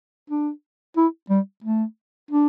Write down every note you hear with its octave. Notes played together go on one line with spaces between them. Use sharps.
D4
E4
G3
A3
D4